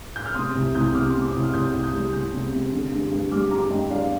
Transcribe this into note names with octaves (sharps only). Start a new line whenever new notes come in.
G6
F6
C3 C6 D#6
C2
C2 D#6 G6
C3 D6 F6
C3 C6
D6
C2 D#6
F6
C2 D#6 G6
C2
D#6 G6
G3
C2 D#6 G6
C3
C3
D3
G2
G2
G3 D6 F6
G2 A#5 D6
G2 D#5 G5
G2 D5 F5